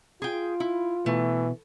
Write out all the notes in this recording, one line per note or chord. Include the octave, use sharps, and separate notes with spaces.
F4 G#4 G5
E4
B2 E3 A3